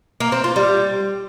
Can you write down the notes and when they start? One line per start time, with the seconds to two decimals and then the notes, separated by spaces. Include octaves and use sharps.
0.20 A#3
0.32 C4
0.44 F4
0.56 G3